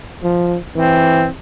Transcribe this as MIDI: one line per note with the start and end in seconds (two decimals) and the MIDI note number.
0.24 0.58 53
0.76 1.27 52
0.76 1.28 60